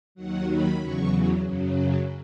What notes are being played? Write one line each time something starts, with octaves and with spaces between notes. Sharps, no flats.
D#2 D#3 F#3 F#5
B5
E2 C#3 F#3 C#6
F#2 C#3 F#3